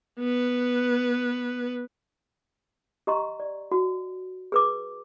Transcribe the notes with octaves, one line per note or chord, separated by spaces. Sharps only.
B3 B4
G4 D#5 A#5 C6 C#6
D5
F#4
G#4 B4 D6